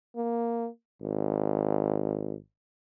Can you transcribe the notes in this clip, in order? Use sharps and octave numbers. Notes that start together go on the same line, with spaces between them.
A#3
G#1